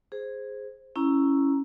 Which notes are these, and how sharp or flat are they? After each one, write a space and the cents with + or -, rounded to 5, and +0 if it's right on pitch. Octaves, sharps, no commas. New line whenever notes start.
G#4 +0 C5 +0
C#4 +0 E4 +0 A#5 +0